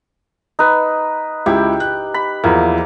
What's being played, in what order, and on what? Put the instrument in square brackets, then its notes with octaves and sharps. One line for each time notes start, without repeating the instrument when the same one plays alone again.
[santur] D#4 B4
[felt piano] C#2 E4 [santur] G4
[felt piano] F#6
[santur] B5
[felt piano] E2 F3 E4 [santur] A#3